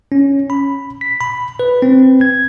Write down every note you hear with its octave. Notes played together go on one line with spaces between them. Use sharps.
C#4
B5
B6
B5
B4
C4
G#6